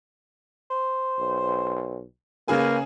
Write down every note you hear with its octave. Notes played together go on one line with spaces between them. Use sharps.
C5
B1
C#3 A#3 G#4 B4 G#5